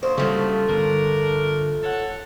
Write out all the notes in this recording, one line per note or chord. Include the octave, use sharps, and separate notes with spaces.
D2 B2 A#3 C5
C#3 F3 G3 A3
G1 D4 A#4
A4 C#5 F#5